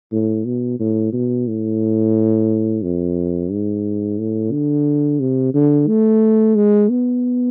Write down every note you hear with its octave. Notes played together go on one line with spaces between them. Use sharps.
A2
B2
A2
B2
A2
F2
G#2
A2
D3
C3
D3
A3
G#3
B3